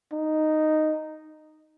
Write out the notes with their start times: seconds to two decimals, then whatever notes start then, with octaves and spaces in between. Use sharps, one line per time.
0.12 D#4